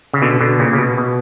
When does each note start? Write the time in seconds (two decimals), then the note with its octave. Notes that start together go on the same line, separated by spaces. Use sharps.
0.14 C#3
0.22 B2 D3
0.41 B2 D3
0.59 A#2 C#3
0.73 C#3
0.78 B2
0.97 B2